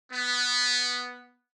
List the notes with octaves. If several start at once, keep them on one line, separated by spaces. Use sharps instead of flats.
B3